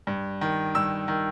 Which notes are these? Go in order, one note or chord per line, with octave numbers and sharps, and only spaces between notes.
G2
D#3
G2 E6
D#3